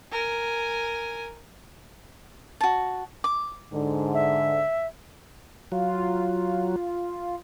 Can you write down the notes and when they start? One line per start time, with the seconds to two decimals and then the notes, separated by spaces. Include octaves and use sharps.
0.11 A#4 G#5
2.61 F#4 A5
3.24 D6
3.73 G#2 D3
4.14 E5
5.72 F#3 F4